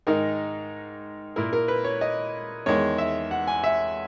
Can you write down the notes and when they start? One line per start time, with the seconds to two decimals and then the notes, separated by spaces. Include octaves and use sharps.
0.07 G#2 D#3 G#3 D#4 A#4
1.36 A#2 A#3 E4 A#4
1.53 A#4
1.68 B4
1.85 C#5
2.01 D#5
2.66 E2 D#3 G#3 C#5
2.98 E5
3.31 F#5
3.47 G#5
3.64 E5